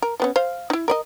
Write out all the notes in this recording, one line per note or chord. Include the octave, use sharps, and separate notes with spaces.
A#4
F3 B3 C#4
C5 F5
D#4 E4
A#4 D5 D#5